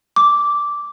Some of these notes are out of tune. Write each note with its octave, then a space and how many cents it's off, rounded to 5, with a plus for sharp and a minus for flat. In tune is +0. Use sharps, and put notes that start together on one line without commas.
D6 -10